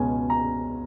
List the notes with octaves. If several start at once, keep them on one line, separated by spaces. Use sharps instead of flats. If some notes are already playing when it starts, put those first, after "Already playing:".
Already playing: C#2 B2 G#3 C#4 G#5
A#5